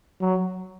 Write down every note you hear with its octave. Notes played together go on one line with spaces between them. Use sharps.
F#3